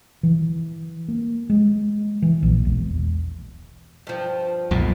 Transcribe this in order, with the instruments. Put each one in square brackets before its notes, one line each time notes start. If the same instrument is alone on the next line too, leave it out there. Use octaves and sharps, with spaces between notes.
[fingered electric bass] E3
A#3
G#3
E3
A#1
E1
[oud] G2 F3
[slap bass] B1 F2 A#2